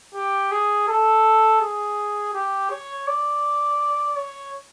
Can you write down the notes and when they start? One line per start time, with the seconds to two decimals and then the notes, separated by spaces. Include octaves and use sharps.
0.15 G4
0.51 G#4
0.88 A4
1.61 G#4
2.34 G4
2.70 C#5
3.07 D5
4.16 C#5